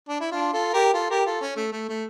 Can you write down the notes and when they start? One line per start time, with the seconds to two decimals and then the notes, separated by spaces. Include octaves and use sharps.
0.09 D4
0.20 E4
0.31 D4 F4
0.53 F4 A4
0.73 G4 A#4
0.93 F4 A4
1.10 G4 A#4
1.26 F4 A4
1.41 C#4
1.56 A3
1.72 A3
1.88 A3